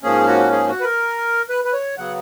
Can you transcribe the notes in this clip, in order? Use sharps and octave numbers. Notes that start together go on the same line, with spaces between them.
G#2 F3 A#3 C#4 G#4
F#4
G#4
F#4
B4
A#4
B4
B4
C#5
C#3 F#3 B3 F#5